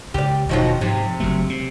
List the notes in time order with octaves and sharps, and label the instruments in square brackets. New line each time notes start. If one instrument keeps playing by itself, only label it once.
[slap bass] C#2 [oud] G4 D5
[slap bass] E1 B2 [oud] D#3 F3 F#3
[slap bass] G#2 F3 [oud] C3
[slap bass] F#1 F#3 A3
C3